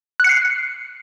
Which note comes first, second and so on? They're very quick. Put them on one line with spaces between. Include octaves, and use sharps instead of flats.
F#6 C#7 C7